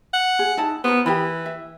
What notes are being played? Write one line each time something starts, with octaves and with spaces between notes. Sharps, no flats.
F#5
G#4
D#4 E4 A5
B3 A#4 C5
E3 G4 A#4 B5
E5